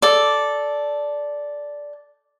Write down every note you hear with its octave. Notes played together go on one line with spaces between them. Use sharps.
A4 D5